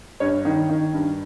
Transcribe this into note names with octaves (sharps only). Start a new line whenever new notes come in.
G2 C#5
D#3
D#3
G2